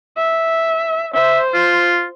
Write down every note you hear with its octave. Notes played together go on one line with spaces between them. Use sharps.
E5
C5 E5
F4